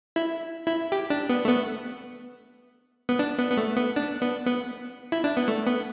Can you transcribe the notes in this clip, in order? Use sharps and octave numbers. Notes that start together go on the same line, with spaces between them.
E4
E4
G4
D4
B3
A3
B3
B3
D4
B3
B3
A3
B3
D4
B3
B3
E4
D4
B3
A3
B3